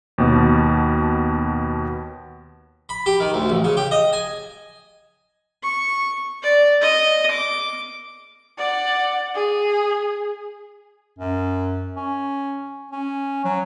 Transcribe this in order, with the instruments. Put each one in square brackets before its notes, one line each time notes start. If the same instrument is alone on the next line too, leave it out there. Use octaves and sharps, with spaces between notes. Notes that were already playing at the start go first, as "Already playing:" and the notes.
[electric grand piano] D#2 B2
[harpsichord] B5
G4
D#3
D2
A1
C#3
G4
D#5
G#5
[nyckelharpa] C#6
D5
D#5
D6
[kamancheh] D5 F#5
G#4
[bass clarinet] F#2
C#4
C#4
F#3